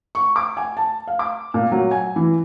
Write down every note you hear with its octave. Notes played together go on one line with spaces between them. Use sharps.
C#6
D6
G#5
A5
F5
D6
A#2
F#3
G#5
E3